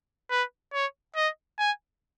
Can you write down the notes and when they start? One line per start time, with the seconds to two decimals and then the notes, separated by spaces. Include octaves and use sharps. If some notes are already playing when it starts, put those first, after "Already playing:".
0.30 B4
0.73 C#5
1.16 D#5
1.58 G#5